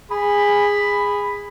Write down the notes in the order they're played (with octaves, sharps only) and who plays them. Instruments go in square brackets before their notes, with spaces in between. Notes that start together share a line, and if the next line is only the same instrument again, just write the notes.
[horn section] G#4 B5